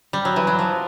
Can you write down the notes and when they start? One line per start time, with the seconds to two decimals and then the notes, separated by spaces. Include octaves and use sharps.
0.13 G3
0.25 F#3
0.36 E3
0.47 F#3
0.59 F3